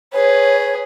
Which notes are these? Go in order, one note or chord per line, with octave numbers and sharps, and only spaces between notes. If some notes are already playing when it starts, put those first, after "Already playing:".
G#4 B4 C#5